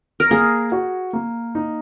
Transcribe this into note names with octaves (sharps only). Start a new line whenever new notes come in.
A#4
A#3 G#4
F#4
A#3
D#4